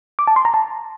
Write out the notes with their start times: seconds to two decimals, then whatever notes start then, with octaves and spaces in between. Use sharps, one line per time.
0.19 D6
0.27 A5
0.36 C6
0.45 A#5
0.54 A5